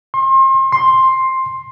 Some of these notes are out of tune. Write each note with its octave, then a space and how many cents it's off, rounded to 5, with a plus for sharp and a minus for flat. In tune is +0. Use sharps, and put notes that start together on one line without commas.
C6 +35
C6 +10